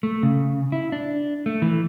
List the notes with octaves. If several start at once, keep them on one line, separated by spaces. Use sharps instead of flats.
A3
C#3
E4
D4
A3
E3